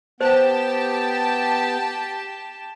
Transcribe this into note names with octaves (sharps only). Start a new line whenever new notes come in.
B3 G4 C5 A5